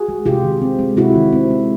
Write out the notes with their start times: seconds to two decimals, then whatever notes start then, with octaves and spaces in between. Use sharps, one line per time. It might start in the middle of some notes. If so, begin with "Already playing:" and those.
Already playing: F#4 G#4
0.08 G#3
0.26 C3 F4 G4
0.43 D#3
0.62 C4
0.79 G#3
0.97 C3 E4 F#4
1.15 D#3
1.33 C4
1.50 G#3